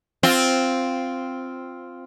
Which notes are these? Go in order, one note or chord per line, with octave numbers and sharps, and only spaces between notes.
C4 F4